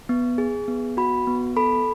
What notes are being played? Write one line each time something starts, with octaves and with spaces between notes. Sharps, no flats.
B3
G#4
B3
F#4 B5
B3
A4 B5